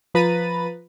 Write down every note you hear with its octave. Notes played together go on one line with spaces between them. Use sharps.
F3 B4 A#5 B5 A6 D#7